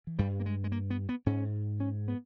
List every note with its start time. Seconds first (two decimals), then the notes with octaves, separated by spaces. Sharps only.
0.07 E3
0.19 G2 G3
0.40 A#3
0.46 G#3
0.64 G#3
0.72 A#3
0.90 B3
1.09 B3
1.26 G#2 C#4
1.80 C#4
2.08 B3